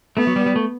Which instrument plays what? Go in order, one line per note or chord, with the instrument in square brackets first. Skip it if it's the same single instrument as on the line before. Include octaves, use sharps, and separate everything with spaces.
[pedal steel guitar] A3 [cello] B3
[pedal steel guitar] F#3
G3
G3
A3